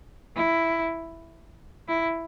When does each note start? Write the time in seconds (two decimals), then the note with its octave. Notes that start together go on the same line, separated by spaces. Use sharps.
0.36 E4
1.88 E4